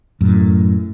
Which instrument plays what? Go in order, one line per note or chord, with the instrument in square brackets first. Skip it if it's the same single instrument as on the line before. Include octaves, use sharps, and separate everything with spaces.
[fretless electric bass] F#2 A2